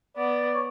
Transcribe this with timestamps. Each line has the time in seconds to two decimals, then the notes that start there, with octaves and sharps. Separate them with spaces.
0.17 B3 D5
0.54 C#5